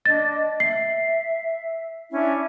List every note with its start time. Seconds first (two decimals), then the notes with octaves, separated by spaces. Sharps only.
0.06 D4 D#5 A6
0.60 E5 C7
2.11 C#4 D4 E4